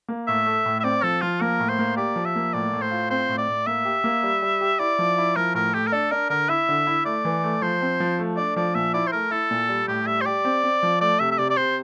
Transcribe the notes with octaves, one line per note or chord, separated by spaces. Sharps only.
A#3
A2 E5
A3
A2
E5
C4 D5
F3 A4
F3 F4
A#3 A#4
A2
C5
A#3
G4 D5
F3
E5
A#3
A2 D5
A2
C5
F4
C4 C5
A2
D5
A2
A#3 E5
G4
A#3
G3
G3
G4
E4 D5
F3
E4
F3 A#4
A2 A#4
A3 G4
A#4
D4 A4
D4 A#4
D3 A#4
E4 E5
D3
E4
A3 D5
E3
A3
F3 C5
C4
F3
A3
D4 D5
F3 D5
A#2 E5
E4 D5
C5
A3 A#4
E4 A4
A#2
G3
A2 G4
G3 E5
C5
G4 D5
C4
C4
F3
A3 D5
C3 E5
E5
C3 D5
D5
C3 C5